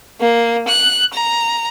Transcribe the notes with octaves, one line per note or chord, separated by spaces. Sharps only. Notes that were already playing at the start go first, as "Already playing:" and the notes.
A#3
F#6
A#5